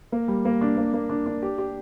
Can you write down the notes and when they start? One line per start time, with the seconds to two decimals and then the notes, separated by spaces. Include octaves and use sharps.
0.12 A#3
0.28 G3
0.45 A#3
0.61 D4
0.77 A#3
0.94 A#3
1.09 D4
1.26 D4
1.42 G4
1.58 G4